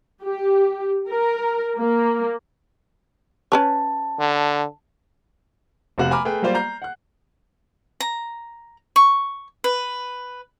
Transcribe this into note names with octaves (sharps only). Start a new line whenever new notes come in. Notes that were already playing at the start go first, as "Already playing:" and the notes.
G4
A#4
A#3
C#4 B4 C#5 A5
D3
F1 C3 F#4 F5 F#7
G#5 A#5 B5 D6 F6
A3 G#4 B4 G5
F#3 G3 A#3 F4 C5 D5
A#5 G6 C7
F#5 F#6
A#5
C#6
B4